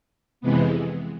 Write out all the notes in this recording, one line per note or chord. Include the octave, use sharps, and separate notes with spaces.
F2 C3 E3 G#3 B3